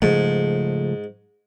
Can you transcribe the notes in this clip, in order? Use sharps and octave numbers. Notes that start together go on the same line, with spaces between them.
G#2 C#3 F3 A3